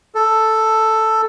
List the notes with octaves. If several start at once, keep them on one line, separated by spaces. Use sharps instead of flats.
A4